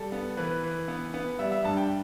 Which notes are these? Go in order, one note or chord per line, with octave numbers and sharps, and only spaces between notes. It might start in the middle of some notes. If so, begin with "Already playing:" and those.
Already playing: G3 A4
B3
E3 B4
E3
B3
B3
G3 E5
E5
G2 A5
G5